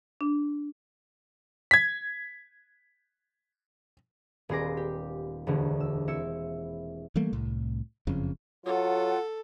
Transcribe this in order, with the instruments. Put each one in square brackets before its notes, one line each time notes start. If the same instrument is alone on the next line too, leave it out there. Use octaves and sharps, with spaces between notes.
[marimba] D4
[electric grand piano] G#6 B6
[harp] D#1 B3 G#4 C6 D6 A#6
G4
E1 D2 D3 A#3
E6
C4 E4 E6 C#7
[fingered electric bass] E3 G3 A3 A#3
C2 A2
F#1 F2 C#3
[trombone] F#3 [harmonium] F4 [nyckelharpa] A4 [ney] F#5